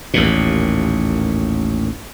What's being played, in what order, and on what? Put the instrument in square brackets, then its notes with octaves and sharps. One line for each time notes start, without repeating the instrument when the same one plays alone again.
[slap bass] A1 D#2 A#2